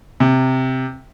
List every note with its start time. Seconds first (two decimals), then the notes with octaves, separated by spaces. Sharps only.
0.20 C3